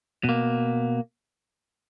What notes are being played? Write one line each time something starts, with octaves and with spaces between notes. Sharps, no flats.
B2 A#3